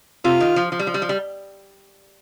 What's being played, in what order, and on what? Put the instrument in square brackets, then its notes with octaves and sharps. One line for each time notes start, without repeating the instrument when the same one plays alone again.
[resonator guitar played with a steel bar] C3 [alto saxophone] F4
[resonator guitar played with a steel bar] D#3
F3
F3
G3
F3
G3
F3
G3